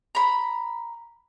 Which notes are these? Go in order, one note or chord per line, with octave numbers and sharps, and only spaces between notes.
A#5 B5